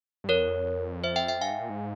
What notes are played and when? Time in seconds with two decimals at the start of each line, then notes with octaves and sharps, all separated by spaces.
0.24 G2
0.29 F2 A#4 C#5
0.40 E2
0.47 F2
1.04 C5 E5
1.16 E5 G5
1.28 E5 G5
1.41 G2 F5 G#5
1.50 G#2
1.61 A#2
1.69 G#2